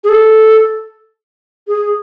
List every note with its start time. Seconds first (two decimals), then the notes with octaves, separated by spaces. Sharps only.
0.04 G#4
0.09 A4
1.68 G#4